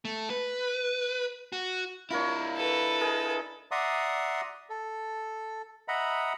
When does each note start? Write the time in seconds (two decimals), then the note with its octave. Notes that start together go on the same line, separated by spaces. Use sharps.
0.05 A3
0.30 B4
1.52 F#4
2.10 D4 E4 F4 A#4 C#5
2.56 A4 B4
3.00 D#4 G#4 A#4
3.71 D5 E5 F#5 A#5 C6 D#6
4.70 A4
5.88 D#5 E5 F#5 A#5 B5